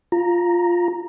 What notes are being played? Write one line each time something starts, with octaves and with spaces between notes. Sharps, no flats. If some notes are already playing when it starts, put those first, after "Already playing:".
F4 A#5